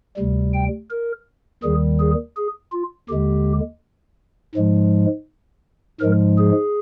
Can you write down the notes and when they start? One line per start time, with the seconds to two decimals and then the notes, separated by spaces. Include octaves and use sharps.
0.17 D2 C3 G3
0.54 G5
0.90 A#4
1.63 D#2 D#3 G3 G#4
1.99 G#4
2.36 G#4
2.72 F4
3.09 D#2 D3 G#3 G4
4.55 G#2 F3 G#3
6.00 G#2 F3 G#3 A#4
6.38 G#4